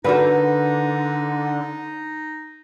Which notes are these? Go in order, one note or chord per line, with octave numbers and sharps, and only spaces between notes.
D3 D#4 F#4 A#4 B4